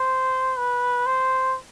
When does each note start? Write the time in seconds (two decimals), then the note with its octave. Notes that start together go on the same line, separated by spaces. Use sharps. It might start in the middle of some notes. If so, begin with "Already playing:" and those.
Already playing: C5
0.57 B4
1.06 C5